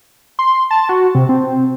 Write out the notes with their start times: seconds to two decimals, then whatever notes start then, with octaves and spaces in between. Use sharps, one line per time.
0.39 C6
0.71 A5
0.89 F#4
1.15 C3
1.29 C4